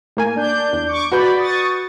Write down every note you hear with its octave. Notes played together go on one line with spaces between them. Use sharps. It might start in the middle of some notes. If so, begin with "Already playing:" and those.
A2 A#3 G#5
D4 G6
E2
C#6 D6
F#4 B4 D5 B5 G6
C#6 D#6 A6